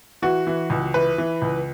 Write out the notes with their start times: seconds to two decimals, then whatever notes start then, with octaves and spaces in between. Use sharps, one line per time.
0.22 E3 F#4
0.47 E3
0.70 C#2
0.94 E3 B4
1.18 E3
1.42 C#2